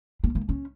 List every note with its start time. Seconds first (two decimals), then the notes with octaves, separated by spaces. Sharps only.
0.24 A#3
0.35 A#3
0.49 C#4